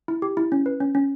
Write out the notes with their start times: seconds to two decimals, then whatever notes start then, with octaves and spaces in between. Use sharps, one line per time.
0.08 E4
0.22 G4
0.37 E4
0.52 C#4
0.66 B4
0.80 C#4
0.95 C#4